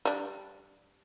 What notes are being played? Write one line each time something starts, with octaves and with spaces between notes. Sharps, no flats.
G3 D4